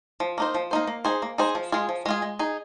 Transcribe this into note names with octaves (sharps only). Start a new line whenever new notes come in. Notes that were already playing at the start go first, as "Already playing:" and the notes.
F3
A#3 D#4 C5
F3
A#3 D#4 C5
A#3
D#4 G#4 C5
A#3
D#4 G#4 C5
F3
G#3 F4 G#4
F3
G#3 F4 G#4
G#3
D#4 G#4